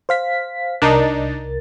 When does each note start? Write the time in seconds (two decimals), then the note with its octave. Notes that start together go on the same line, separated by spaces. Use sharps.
0.09 C5 F5 B6
0.82 C2 D4 D#4 A#4 A6